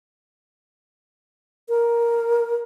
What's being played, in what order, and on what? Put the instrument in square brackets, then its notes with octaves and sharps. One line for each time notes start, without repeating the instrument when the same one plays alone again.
[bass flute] A#4